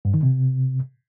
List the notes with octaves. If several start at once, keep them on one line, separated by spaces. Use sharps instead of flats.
G2
D#3
C3